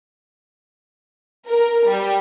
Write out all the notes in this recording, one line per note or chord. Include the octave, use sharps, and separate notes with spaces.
A#4
G3